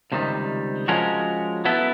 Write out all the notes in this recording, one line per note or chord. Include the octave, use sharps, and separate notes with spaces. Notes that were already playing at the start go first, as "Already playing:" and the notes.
C#2 C3 D#3 G3
F3 G#3 C#4 F#4 A#4
F#3 B3 E4 A4